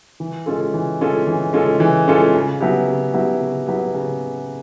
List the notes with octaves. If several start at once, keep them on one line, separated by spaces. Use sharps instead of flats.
E3
G#3 C#4 F4 A4
E3
G#3 C#4 F4 A4
E3
G#3 C#4 F4 A4
E3
G#3 C#4 F4 A4
C#3
F#3 B3 E4 G4
C#3
F#3 B3 E4 G4
C#3
F#3 B3 E4 G4
C#3